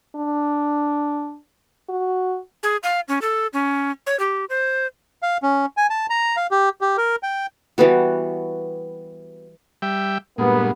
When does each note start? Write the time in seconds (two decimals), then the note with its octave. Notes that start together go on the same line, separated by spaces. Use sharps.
0.16 D4
1.89 F#4
2.63 G#4
2.83 F5
3.08 C#4
3.22 A4
3.53 C#4
4.07 C#5
4.20 G4
4.49 C5
5.22 F5
5.43 C#4
5.77 G#5
5.90 A5
6.10 A#5
6.37 F5
6.51 G4
6.81 G4
6.97 A#4
7.23 G5
7.78 E3 G3 B3 F#4
9.82 G3 E5 G5
10.38 G2 A#2 G#3 A#3 B3